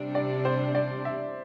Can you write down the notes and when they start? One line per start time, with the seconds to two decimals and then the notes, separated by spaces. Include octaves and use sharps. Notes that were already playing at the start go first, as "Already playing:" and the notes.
Already playing: C3 G3 D4
0.15 D5
0.45 C5
0.75 D5
1.05 E5